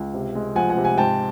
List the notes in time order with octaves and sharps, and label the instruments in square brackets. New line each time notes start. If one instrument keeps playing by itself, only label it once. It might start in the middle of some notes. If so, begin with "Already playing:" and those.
Already playing: [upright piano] C#2
C3
G#3
F3 F#5 G#5
F#5 G#5
C3
F#5 G#5
G#2 G5 A5